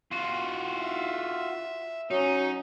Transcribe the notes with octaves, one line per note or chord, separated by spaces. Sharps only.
F4 F#4
E5
F#3 C#4 D#4